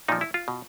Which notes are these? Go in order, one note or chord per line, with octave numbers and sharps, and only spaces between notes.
A#2 F3 D#4
E4
F4
B2